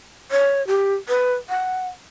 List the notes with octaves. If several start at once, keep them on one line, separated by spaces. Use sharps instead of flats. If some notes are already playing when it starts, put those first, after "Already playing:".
C#5
G4
B4
F#5